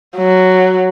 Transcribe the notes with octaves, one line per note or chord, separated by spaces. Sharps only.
F#3